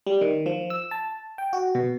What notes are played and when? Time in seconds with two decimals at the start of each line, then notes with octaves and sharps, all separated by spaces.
0.07 G3
0.21 D#3
0.46 F3
0.70 E6
0.91 A5
1.38 G5
1.53 F#4
1.75 B2